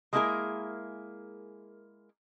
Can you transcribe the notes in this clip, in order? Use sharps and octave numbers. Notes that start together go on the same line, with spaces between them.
G#3 A#3 D4 E4 G#4 A#4